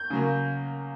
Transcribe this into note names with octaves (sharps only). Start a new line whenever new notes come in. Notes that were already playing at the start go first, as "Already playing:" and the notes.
Already playing: G6
C#3 F#3 A#3